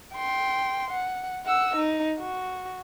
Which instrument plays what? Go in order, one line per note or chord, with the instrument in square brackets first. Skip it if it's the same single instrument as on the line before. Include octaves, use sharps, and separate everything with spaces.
[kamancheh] G5 C6
F#5
F#5 E6
D#4
F#4